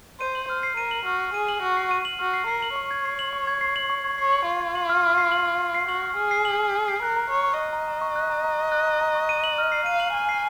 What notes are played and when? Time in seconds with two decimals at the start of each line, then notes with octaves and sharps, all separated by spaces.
0.20 C5 D#7
0.35 F#7
0.49 C5 F6
0.63 C7
0.77 A#4 D#7
0.91 F#7
1.06 F#4 F6
1.20 C7
1.34 G#4 D#7
1.49 F#7
1.62 F#4 F6
1.77 C7
1.91 D#7
2.05 F#7
2.19 F#4 F6
2.34 C7
2.47 A#4 C7
2.62 F#7
2.76 C#5 C#6
2.91 G#6
3.05 C7
3.19 F#7
3.33 C#6
3.47 G#6
3.61 C7
3.76 F#7
3.90 C#6
4.04 G#6
4.18 C#5 C7
4.33 F#7
4.46 F4 C#6
4.61 G#6
4.75 F#7
4.89 F6
5.03 F6
5.18 C7
5.32 F#7
5.46 F6
5.60 F6
5.74 C7
5.89 F#4 F#7
6.02 F6
6.17 G#4 F6
6.31 C7
6.45 F#7
6.59 F6
6.74 F6
6.88 C7
7.02 A#4 F#6
7.17 A#5
7.30 C#5 A#5
7.44 C#6
7.59 D#5 F#6
7.73 A#5
7.88 A#5
8.01 C#6
8.16 F#6
8.30 A#5
8.44 A#5
8.59 C#6
8.72 F#6
8.86 A#5
9.01 A#5
9.15 C#6
9.29 D#7
9.44 F#7
9.58 F6
9.72 C7
9.86 F5 D#7
10.00 F#7
10.14 G#5 F6
10.29 C7